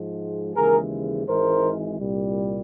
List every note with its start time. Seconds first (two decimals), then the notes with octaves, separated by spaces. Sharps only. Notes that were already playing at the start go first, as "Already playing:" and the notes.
Already playing: G#2 F3 G#3
0.54 D#2 C#3 E3 G#3 G#4 A#4
1.26 G#1 G#2 E3 G#3 A#4 C5
2.00 C2 A#2 G3